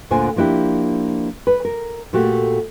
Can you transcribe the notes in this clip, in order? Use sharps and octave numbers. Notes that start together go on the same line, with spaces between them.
D2 A#2 D3 C5 G#5
F3 A#3 D4 E4 G4
B4
A#4
A#2 A3 F#4 G4